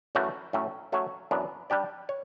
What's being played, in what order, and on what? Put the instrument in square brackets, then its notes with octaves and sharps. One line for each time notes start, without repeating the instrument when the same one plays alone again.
[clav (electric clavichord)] F#2 E3 A3 C#4 F#4
A2 F#3 A3 C#4
F#3 A3 C#4 F#4 C#5
F#2 E3 B3 D4
G3 D4 G4 D5
C#5